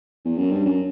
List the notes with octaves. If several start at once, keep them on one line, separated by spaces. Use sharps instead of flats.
E2
F#2
G2
F#2